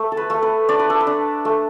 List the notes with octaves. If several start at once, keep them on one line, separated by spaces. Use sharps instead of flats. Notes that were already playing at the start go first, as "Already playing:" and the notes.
Already playing: A3
A4
B4
A3
B4
D4 D5
B4
A4
B4
D4
A3